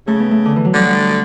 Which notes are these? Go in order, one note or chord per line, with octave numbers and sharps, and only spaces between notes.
C#3 A3
B3
A3
D3
E3
F#3
D3 G3